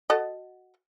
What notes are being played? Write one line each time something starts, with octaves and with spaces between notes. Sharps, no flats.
F#4 A4 D#5